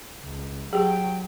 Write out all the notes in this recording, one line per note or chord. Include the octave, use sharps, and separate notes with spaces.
C#2
F#3 G4 G#4 G5